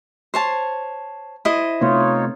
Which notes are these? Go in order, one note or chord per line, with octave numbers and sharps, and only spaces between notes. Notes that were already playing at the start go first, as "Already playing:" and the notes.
C5 C#5 A5
E4 C5 D#5
C3 A3 B3 D#4 F4 C#5